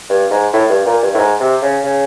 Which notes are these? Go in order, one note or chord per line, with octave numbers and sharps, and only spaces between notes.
G2
G#2
A2
G2
A#2
G2
A2
G#2
C3
C#3
C#3